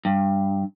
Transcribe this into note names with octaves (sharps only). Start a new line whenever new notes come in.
G2